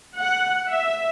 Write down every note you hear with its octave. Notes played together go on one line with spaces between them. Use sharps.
F#5
E5